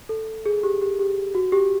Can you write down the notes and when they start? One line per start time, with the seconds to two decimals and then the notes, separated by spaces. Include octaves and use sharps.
0.09 A4
0.46 G#4
0.63 G4
0.81 G4
0.99 G4
1.35 F#4
1.52 G4